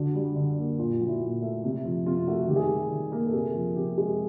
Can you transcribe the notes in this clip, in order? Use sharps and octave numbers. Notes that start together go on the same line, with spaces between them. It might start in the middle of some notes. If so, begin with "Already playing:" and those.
Already playing: D3 F#4
G3
D3
A#3
A#2 F4
F4
F#3
E4
A#2
A3
C3
F3
C3 F4
A3 F#4
D#3 G4
G#4
G4
G3
D#3
A#3
A4
C3 G#4
F3
C3 G4
G#3